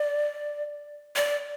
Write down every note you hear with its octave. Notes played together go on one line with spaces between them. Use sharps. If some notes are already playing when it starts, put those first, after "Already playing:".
Already playing: D5
D5